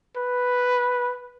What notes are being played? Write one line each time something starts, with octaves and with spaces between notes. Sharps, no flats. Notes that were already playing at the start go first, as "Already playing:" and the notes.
B4